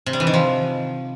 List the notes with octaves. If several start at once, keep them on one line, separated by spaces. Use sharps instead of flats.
C3
G3
E3
D#3
F3